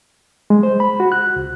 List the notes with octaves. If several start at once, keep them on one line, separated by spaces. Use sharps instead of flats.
G#3
C5
B5
F#4
F#6
C#2